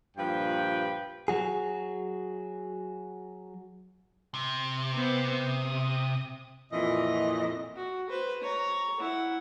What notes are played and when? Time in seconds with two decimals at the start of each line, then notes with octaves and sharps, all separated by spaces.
0.17 G2 A#2 F3 B4 G5
1.28 F#3 F#4 G#4
4.34 C3
4.95 B3 C5
5.46 D#6
6.71 F2 A#2 E3 D#5
7.76 F#4
8.09 B4 C5
8.42 C#5 A#5
9.00 E4 F#5